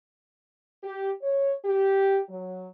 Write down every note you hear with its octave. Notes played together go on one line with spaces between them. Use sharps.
G4
C#5
G4
F#3